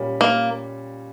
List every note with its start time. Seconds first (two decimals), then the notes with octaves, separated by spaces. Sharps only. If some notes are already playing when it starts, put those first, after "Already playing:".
Already playing: A#2 G3 C#4
0.21 A#3